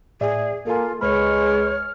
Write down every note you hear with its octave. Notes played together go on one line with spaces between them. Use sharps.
A2 G#4 D5 E5
A#3 F4 A4 G#5
C#2 G#3 B4 C#5 B5 F6